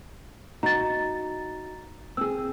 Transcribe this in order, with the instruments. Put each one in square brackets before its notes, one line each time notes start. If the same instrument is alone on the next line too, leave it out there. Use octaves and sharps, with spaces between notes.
[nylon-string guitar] D#4 F#4 [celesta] A#5 A6
[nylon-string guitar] C4 G#4 [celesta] E6